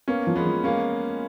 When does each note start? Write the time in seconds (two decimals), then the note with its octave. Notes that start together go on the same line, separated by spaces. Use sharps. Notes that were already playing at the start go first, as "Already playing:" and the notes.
0.08 A#3 B3 C#4
0.27 F3
0.36 G#3 B3
0.45 F3
0.64 G#3 A#3 C#4